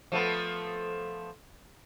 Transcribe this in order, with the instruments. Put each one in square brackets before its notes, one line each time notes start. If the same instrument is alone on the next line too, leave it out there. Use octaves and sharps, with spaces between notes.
[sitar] F3 A3 B3